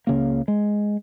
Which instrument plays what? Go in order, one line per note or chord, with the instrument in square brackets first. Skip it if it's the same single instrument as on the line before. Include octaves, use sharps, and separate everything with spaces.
[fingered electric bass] C#2 C#3 A#3
G#3